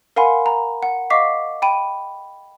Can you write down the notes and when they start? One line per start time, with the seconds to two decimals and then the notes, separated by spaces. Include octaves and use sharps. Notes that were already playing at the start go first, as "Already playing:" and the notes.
0.16 A#4 F5 F#5 G#5 B5 C6
0.46 A#5
0.83 F#5
1.10 D#5 F5 C#6 D6 B6 C7
1.62 G5 B5 D#7